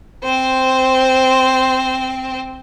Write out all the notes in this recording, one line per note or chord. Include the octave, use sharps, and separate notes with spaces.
C4 C5